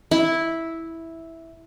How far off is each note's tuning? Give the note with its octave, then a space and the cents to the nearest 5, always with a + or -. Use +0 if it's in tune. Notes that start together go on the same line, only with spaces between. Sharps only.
E4 -5